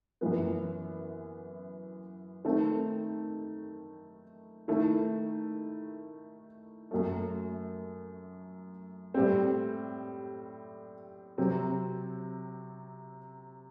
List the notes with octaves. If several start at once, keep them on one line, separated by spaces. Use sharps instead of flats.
F#2 E3 B3
D#3 A3 C4
D#3 A3 E4
F#2 F#3 A3
A2 G3 C4
C3 F#3 C4